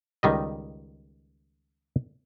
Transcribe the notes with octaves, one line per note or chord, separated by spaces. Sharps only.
C#2 D#3 G3 D#5